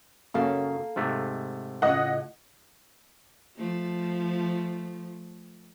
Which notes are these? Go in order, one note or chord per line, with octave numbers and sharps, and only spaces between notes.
F#2 C#3 A#3 A4 F5
G#2 C3 A3
A2 C#3 F4 D#5 F#5
F3 A3